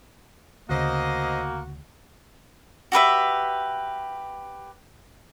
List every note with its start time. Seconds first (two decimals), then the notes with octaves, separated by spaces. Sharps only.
0.69 D2 C#3 A#3 F#4 C5 D#5
2.92 F#4 G4 B4 E5